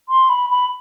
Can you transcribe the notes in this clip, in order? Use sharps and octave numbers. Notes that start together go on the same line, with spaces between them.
C6
B5
B5